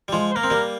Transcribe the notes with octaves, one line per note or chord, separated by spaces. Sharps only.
G3
F3 G#3
C5
A#3 A#4
C4
G3 A#3